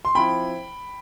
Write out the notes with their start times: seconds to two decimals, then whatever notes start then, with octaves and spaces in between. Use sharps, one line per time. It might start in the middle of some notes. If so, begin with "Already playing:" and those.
0.05 C6
0.15 F3 C4 E4 G5 B5